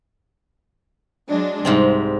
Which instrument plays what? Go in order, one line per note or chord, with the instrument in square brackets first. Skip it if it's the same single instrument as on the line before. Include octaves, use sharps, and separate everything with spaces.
[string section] F#3 G#3 D4
[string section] C2 [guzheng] G#2 C3 C4